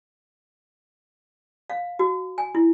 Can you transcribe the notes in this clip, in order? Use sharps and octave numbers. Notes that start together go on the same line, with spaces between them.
F5
F#4
G#5
E4